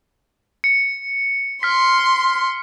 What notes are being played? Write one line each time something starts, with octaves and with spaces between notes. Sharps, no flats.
C#7
C6 F6 B6